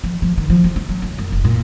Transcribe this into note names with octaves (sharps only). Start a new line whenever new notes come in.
F3
F3
D#3
F3
F1
C#3
F#3
C2
F#2
F1
A#2